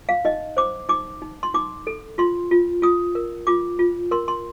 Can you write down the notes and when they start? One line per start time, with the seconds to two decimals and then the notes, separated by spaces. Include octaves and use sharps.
0.09 F5
0.25 D#4 D#5
0.57 C5 D6
0.89 D#4 D6
1.22 D#4
1.43 C6
1.54 D#4 D6
1.87 A4
2.18 F4 C6
2.51 F4
2.82 F4 D#6
3.15 A#4
3.47 F4 D6
3.79 F4
4.11 A#4 C6
4.28 C6